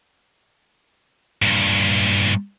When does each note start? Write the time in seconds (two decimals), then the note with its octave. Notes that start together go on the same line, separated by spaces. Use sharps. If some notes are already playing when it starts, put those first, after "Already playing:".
1.42 G2 A#2